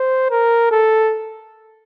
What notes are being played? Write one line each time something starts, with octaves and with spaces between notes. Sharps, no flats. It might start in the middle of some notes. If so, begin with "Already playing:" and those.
Already playing: C5
A#4
A4